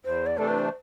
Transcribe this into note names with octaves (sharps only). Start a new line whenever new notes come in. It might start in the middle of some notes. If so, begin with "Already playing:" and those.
E2 C5
D5
C3 E3 A3 D4 A4
B4
C5